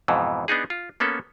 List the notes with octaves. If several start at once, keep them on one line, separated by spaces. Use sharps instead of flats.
F2 G#2 B2 E3
B3 D4 D#4 G#4
F4
A#3 B3 C#4 A4